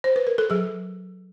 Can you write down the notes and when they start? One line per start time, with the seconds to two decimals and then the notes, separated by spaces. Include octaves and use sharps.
0.04 C5
0.16 B4
0.27 A#4
0.38 A4
0.50 F#3 G#4